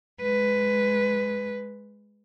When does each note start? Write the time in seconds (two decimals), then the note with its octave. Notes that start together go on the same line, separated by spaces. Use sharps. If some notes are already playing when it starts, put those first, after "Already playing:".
0.22 G#3 B4